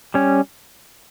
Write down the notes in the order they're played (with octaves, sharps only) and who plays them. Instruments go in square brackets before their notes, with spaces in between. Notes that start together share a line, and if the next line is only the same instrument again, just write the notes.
[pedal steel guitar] G3 C#4